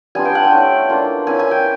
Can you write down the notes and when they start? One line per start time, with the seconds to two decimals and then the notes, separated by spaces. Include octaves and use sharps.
0.15 G3 B3 D4 F4 G#5
0.25 G5
0.35 F#5
0.45 G5
0.52 A3 C#4 E4
0.89 A#3 D4 F4
1.27 A#3 C#4 E4 G#5
1.39 G#5
1.51 G5